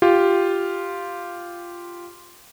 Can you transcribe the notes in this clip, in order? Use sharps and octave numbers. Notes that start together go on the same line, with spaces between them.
F4 G4